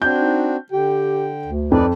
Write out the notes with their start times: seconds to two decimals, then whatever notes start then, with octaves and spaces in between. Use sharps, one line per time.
0.02 C4 D4 F#4 G6
0.21 D#4
0.72 D3 G4 G5
1.44 D2
1.72 F2 D#4 B4 D5